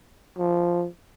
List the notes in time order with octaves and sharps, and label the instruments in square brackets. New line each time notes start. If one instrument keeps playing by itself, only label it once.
[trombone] F3